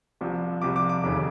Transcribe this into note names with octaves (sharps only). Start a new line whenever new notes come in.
C2 C3 F3
C2 C3 F3 D6
D6
D6
F1 D#2 C#3